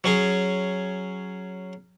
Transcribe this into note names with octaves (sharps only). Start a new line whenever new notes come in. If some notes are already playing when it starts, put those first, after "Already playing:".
F#3 C#4 G#4